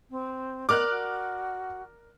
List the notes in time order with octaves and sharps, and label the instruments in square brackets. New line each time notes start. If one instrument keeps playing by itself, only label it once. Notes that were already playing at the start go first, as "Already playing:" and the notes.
[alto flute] C4
[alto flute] B3 [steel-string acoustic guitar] A#4 D5 [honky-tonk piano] D6 F6 F#6
[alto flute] F#4